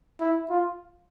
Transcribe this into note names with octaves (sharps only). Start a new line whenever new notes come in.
E4
F4